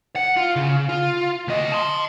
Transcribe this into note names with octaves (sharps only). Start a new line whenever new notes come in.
F#5
F4
C#3
F4
D2 D#5
A5 C6